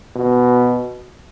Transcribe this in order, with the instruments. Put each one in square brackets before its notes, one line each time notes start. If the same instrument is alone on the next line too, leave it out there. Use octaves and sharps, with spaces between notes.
[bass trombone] B2